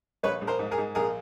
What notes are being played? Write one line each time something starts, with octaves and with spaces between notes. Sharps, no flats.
A#1 B4 C#5
A#1
A#4 C5
G#2
G#4 A#4
G#2
A#1 G#4 A#4